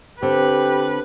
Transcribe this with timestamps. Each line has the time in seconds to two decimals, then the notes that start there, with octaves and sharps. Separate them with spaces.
0.22 D3 C4 G4 B4